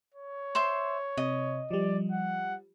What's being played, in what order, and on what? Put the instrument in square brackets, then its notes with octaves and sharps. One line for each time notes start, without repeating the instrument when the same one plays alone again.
[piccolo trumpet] C#5
[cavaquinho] C5 E5 C6
[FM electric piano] C3 [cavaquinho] D#5
[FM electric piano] F3 G3 [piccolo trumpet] D5
[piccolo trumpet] F#5